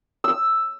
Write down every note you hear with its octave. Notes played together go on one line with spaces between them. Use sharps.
E6